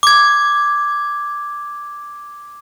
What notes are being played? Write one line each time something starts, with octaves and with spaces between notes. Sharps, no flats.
D6 G#6